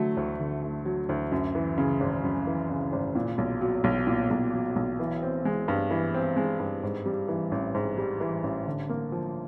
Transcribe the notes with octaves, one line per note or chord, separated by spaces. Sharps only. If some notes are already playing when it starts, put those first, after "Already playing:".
Already playing: D3 F#3 A3
D2
D3
A3
F#3
D2
F#2
E3
C#3
G#1
F#2
E3
C#3
G#1
A#2
B1
F#3
B1
A#2
B1
F#3
B1
E3
C4
G#3
G2
E3
C4
G#3
G2
G#2
G3
E3
A1
G#2
G3
E3
A1
D3
A#3
F3